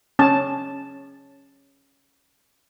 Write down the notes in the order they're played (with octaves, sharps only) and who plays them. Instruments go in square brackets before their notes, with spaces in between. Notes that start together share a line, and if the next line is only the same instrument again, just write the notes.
[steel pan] C#4 A5